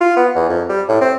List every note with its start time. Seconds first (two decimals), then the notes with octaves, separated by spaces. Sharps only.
0.01 F4
0.17 B3
0.35 E2
0.49 F2
0.69 G3
0.89 A2
1.01 C4